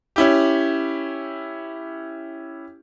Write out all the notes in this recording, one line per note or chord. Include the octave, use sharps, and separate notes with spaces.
C#4 E4 G4